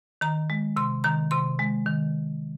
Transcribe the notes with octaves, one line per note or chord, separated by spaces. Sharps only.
D#3 A#5
G#3
C3 C6
D#3 A#5
C3 C6
G#3
D#3